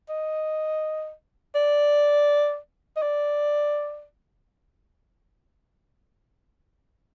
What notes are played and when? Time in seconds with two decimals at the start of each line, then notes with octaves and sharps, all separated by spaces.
0.09 D#5
1.55 D5
2.96 D#5
3.02 D5